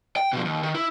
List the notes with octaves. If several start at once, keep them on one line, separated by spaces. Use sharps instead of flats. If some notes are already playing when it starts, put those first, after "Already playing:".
G5
B2 F3
D#2
D#3
E4